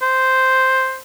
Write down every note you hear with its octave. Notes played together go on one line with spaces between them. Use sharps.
C5